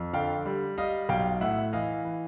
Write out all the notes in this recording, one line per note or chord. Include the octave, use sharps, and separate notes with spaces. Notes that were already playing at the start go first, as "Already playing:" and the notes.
Already playing: F2
D3 F5 G5
G3
G3 D#5 F5
B1 F5 G5
A2 E5 F#5
E3 D#5 F5
E3